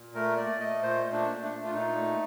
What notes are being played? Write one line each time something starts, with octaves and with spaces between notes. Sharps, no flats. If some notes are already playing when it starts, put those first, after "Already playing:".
Already playing: A#2
A3 A#4
A3 D5
A3 D#5
A#2 C5
A3
D4
A3
D4
A3
F4
A#2 D#4
A3